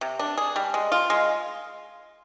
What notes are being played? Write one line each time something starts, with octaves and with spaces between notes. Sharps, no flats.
C3
D4
G#4
G3
G#3
F4
G#3